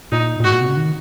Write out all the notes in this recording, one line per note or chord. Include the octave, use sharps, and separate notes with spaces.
A#2 D#4
A#2
G#2 F#4
A#2
C3
C#3
D#3